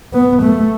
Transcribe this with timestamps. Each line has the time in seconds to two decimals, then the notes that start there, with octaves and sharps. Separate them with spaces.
0.13 B3
0.43 A3